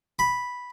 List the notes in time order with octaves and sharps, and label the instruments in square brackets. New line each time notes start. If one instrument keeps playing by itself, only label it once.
[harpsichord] B5